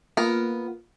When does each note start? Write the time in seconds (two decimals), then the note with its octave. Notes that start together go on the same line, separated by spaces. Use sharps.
0.17 A#3 B3 F4 A#4